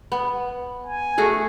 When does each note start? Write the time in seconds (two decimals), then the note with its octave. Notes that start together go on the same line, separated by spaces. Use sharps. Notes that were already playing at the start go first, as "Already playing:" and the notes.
0.12 B3
0.87 G#5
1.18 A3 F#4 G#4